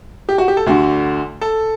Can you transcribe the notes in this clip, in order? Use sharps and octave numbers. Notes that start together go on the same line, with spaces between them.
G4
F#4
G4
A4
D2 D3 F#4
A4